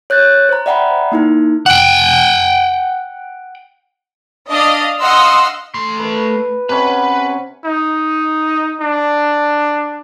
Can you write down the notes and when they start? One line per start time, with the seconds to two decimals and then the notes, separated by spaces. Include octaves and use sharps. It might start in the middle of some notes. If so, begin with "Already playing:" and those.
0.10 C#5 F#6 G6 A6
0.49 C5 A#5
0.66 D5 E5 F#5 G5 A#5 B5
1.12 A#3 D#4 E4
1.66 F#5 G5
4.49 D4 D5 D#5 F5
5.00 D#5 F5 F#5 C6 E6
5.74 A3 C6
6.00 B4
6.69 C3 C#4 B4 F#5
7.65 D#4
8.80 D4